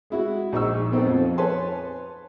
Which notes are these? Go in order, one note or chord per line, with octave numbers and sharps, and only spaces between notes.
G#3 E4 F#4
A#1 D#4 C#6 E6
B3 C4 D#4 A4
F2 F3
B4 C#5 G#5 A5 C6